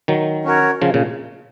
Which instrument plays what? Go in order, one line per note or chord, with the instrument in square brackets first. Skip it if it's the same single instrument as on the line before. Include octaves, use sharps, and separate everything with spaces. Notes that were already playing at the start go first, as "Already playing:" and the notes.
[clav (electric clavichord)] D#3 F#3
[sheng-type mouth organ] C#4 F#4 A#4 C#5
[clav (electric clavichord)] C#3 F3
A#2 C#3